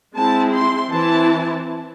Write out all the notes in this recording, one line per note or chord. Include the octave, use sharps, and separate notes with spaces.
G#3 C4 E4 A5
C6
E3 C4 E4 A5